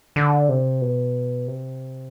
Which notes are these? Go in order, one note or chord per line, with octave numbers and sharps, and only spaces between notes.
D3
C3
B2
C3